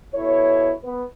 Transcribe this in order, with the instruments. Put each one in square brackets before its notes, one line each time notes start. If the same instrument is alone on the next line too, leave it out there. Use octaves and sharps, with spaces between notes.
[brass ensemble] B2 E4 A4 C#5
B3 B4